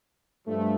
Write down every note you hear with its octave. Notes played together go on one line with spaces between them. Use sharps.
G2 F3 A3